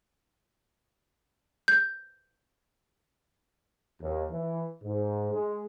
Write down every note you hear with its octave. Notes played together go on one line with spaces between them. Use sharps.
G6
D#2
E3
G#2
G#3